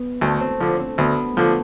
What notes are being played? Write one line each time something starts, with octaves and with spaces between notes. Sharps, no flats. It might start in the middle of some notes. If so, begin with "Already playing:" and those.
Already playing: B3
D2 A3
C4
D3 F3 D4
C4
D2 B3
D3 F3 A3